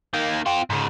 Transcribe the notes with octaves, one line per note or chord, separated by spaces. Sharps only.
D#3 A#3
C4 F4
G#2 C#3